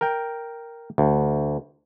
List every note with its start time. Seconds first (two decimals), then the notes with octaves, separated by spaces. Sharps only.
0.01 A#4 G5
0.98 D2